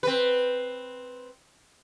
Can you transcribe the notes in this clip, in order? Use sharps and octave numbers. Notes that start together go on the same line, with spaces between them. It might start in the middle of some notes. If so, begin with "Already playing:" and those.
C4 B4